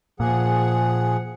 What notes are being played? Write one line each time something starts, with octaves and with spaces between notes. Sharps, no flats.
A#2 F3 G#4 F#5